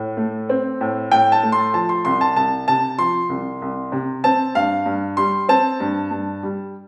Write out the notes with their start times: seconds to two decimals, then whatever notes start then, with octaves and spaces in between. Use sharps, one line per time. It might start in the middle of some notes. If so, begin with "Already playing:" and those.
Already playing: A2
0.17 A3
0.49 C4
0.81 A2
1.11 A2 G5
1.32 A5
1.43 A3
1.52 C6
1.74 F3 A5
1.89 C6
2.05 C2 C6
2.21 A5
2.36 C2 A5
2.68 C3 A5
2.98 F3 C6
3.29 C2
3.62 C2
3.92 C3
4.24 C4 A5
4.55 G2 F5
4.86 G2
5.17 G3 C6
5.49 C4 A5
5.80 G2
6.11 G2
6.43 G3